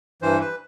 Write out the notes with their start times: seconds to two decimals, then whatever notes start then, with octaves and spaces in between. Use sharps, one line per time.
0.22 G2 E3 C5
0.40 B4